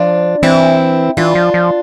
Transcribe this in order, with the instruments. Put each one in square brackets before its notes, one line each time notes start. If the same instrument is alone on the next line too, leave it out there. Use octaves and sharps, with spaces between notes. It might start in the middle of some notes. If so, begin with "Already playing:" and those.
Already playing: [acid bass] F3 [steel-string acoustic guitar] D4 F4
[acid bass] E3 [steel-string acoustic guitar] C4 E4
[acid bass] E3 [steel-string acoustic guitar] D4 F4
[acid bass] F3
F3